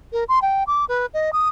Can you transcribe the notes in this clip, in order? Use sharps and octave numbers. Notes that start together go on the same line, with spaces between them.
A#4
C6
G5
D6
B4
D#5
D#6